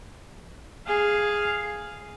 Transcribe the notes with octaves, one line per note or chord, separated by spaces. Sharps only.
G#4 F5